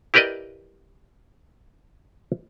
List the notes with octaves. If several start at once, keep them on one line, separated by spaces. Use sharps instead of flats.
E4 G4 A#4 B4 D5 D#5